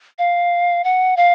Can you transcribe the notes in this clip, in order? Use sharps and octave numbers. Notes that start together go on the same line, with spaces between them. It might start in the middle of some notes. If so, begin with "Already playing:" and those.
F5
F#5
F5